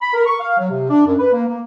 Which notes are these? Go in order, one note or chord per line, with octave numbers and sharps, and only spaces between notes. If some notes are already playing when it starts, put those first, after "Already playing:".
B5
A#4
C#6
F5
F#3
C3
D4
F#2
B4
A#3
A#3